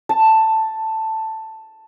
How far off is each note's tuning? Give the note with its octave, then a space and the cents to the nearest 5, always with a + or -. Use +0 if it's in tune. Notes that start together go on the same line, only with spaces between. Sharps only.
A5 +5